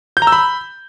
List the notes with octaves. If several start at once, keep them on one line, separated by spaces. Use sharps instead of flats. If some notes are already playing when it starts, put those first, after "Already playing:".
G6
A#5
E6
B5